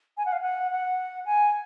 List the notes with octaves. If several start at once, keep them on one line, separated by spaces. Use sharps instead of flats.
G#5
F#5
F5
F#5
F#5
G#5